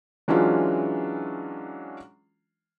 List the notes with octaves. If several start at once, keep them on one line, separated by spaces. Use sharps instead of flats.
E3 F#3 G#3 C#4 D4 F4